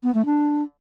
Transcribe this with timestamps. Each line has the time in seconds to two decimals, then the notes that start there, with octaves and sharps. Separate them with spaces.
0.03 B3
0.14 A3
0.25 D4